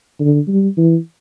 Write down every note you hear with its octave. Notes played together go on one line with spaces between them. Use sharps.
D3
G3
E3